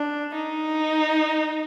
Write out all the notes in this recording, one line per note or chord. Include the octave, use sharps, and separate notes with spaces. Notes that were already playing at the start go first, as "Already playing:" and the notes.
Already playing: D4
D#4